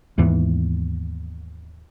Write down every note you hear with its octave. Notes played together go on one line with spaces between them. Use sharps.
D#2 G#2 E3 B3